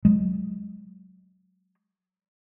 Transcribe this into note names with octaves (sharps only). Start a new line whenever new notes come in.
F#3 G#3